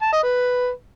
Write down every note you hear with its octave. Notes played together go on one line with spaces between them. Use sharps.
A5
D#5
B4